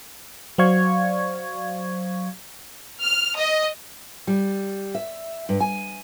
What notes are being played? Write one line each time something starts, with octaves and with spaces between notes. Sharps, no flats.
F#3 C5 D5 F5 C#6 G#6
F6
D#5
G3
E5
G2
G#5